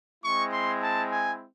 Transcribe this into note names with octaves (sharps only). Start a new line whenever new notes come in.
G#3 C4 E4 C#6
C6
A5
G#5